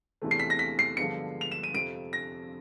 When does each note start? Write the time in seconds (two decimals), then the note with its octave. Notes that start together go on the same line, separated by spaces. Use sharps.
0.22 E2 C3 E3 A3
0.31 C7
0.39 B6
0.50 A#6
0.59 B6
0.79 C7
0.97 G2 D3 F3 G#3 B3 C#7
1.41 F7
1.51 E7
1.63 D#7
1.74 F2 C3 F3 D7
2.13 A#6